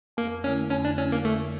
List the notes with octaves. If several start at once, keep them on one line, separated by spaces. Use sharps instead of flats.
F2 A#3
D3 A3 C#4 E4
F2 C#4
D4
D3 A3 C#4 E4
A#3
F2 A3